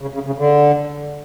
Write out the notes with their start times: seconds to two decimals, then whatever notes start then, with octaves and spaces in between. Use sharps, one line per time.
0.02 C#3
0.14 C#3
0.26 C#3
0.38 D3